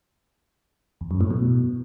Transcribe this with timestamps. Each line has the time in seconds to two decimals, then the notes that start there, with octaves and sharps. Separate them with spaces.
1.01 E2
1.11 F#2
1.21 A2
1.31 B2